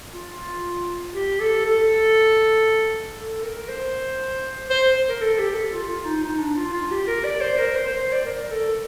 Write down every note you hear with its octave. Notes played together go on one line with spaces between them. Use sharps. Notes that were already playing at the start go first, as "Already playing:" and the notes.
F4
G4
A4
A4
A4
A#4
C5
C5
A#4
A4
G4
A4
F4
F4
D#4
D#4
D4
F4
F4
G4
A#4
D5
C5
A#4
C5
C5
C5
D5
A#4
A4